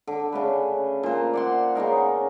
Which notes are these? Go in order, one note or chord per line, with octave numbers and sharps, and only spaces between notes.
D3
C#3 A3 B4
A#2 C5
D5 F#5 C6
C#3 B3 D#4 A#4